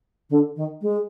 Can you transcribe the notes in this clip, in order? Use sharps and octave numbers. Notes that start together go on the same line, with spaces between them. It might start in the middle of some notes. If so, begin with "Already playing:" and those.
D3
D#3
G#3